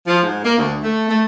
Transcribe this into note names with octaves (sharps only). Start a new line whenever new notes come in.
F3
G#2
A#3
D2
A3
A3